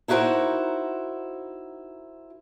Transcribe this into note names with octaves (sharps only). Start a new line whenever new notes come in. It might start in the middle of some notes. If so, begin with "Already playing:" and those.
D#4 E4 F#4 G4 A#4 C5